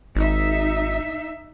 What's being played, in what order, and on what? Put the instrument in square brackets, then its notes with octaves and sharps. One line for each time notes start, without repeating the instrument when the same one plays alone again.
[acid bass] G#1 [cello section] D#4 E5